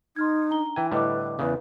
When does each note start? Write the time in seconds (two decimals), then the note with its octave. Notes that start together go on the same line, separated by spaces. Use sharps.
0.16 D#4 C6 F6 G#6
0.51 D4 A#5 G7
0.76 E3 G5 G#5
0.91 A2 D3 G3 E4 B4 D#5 D6
1.39 E2 C#3 B4